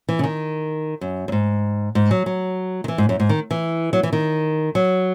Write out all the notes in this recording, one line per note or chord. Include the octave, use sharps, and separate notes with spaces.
E3
C#3
D#3
F#2
F#2
G#2
G#2
F#3
F#3
D#3
E3
G#2
F#2
G#2
D#3
E3
F#3
E3
D#3
F#3